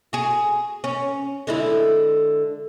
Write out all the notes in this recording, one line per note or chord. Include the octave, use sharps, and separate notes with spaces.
F#4 G#4
C#4
D3 G#3 E4